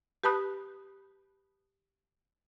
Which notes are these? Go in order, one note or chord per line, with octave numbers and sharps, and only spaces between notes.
G4 B4 A5 B5 D#6 F#6